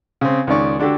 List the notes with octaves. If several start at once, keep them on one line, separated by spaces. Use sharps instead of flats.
C#3 C4
C#2 D#3 C#4 D5 C#6
D3 D4 F#4 G4 A4